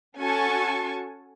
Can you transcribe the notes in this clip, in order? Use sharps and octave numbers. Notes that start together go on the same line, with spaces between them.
C#4 F#4 A4 G#5 A5 C#6